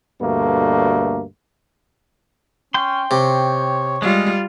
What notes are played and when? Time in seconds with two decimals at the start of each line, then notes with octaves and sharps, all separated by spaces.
0.21 D2 G2 B2 A3 A#3
2.74 C#4 G5 C6
3.11 C3 C#5
4.02 G3 G#3 F4